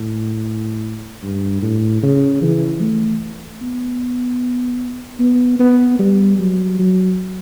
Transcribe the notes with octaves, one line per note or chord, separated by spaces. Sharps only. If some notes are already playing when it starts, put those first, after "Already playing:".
Already playing: A2
G2
A2
C#3
E3
A3
B3
B3
B3
G3
F#3
F#3